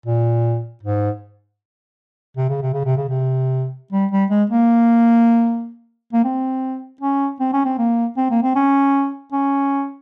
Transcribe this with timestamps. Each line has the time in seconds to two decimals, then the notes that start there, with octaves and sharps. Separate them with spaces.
0.06 A#2
0.83 G#2
2.37 C3
2.49 C#3
2.62 C3
2.73 C#3
2.85 C3
2.97 C#3
3.09 C3
3.93 G3
4.12 G3
4.30 G#3
4.50 A#3
6.13 A#3
6.24 C4
7.01 C#4
7.40 C4
7.53 C#4
7.65 C4
7.79 A#3
8.17 C4
8.31 A#3
8.43 C4
8.56 C#4
9.33 C#4